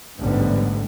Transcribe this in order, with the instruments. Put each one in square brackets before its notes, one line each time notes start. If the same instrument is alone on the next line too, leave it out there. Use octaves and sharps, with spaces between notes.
[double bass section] A1 E2 G#2 D3 G3 B3